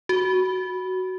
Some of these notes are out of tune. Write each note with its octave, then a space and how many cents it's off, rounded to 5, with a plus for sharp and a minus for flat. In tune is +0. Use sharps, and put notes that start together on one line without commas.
F#4 +5